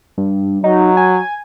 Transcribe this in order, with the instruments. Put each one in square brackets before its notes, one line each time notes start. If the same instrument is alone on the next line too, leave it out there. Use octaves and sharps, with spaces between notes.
[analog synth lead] G2
[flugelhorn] F#3 [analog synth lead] D#4
[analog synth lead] G#5